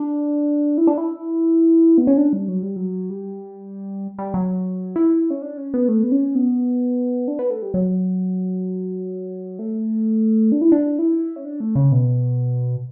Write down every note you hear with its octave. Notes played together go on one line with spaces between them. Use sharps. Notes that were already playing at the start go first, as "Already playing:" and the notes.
Already playing: D4
E4
D4
E4
B3
C#4
D4
G3
F#3
G3
F#3
G3
G3
F#3
E4
C#4
D4
C#4
B3
A3
B3
C#4
B3
D4
B3
A3
G3
F#3
A3
D4
E4
D4
E4
C#4
D4
A3
C#3
B2